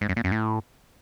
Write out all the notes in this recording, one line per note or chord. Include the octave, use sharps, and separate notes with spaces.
G#2
F#2
A#2
F#2
A2